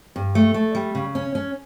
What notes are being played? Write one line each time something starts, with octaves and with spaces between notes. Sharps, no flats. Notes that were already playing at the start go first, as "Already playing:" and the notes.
G2
A3
A3
G3
C#3
C#4
C#4